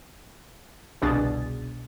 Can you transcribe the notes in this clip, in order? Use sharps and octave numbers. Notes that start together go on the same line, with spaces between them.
G1 C2 B2 D4 G#4 A6